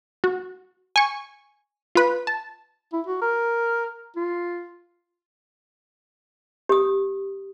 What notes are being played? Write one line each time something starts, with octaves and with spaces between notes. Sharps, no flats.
F#4
G#5 C#6
F4 B4
A5
E4
F#4
A#4
F4
G4 D#6